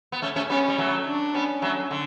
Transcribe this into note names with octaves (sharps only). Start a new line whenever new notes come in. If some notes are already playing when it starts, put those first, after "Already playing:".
B3
A3 C#4
A3 C#4
G3 B3 C#4
G3
F#3 A3
D4
G3 B3 C#4
F#3 A3
D3